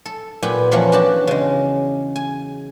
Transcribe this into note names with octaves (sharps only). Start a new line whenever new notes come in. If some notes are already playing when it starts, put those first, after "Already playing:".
A4
A#2 B3 G4 G#5
E2 E3 F3 A#3 C#4 F#5
D4 F#4 G4 F#5 A5
C#3 G#3
G#5